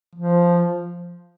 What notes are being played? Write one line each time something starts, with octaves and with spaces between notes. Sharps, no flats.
F3